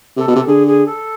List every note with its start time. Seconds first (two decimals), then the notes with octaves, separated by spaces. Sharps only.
0.17 C3 A4
0.28 B2
0.36 C3
0.46 D3 G#4
0.67 G#4
0.86 A4